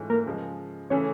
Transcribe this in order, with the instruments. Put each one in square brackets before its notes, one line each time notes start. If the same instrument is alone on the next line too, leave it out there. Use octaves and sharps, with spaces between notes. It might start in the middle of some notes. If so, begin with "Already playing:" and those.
Already playing: [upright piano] G#2 E3 A3 C#4 F4
[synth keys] A#3 A#4
[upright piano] C#3 F3 G#3
[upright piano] C#3 E3 A3 [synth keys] C#4 C#5